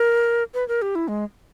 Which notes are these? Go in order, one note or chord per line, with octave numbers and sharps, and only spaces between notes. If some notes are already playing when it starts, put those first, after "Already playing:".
Already playing: A#4
B4
A#4
G4
E4
G#3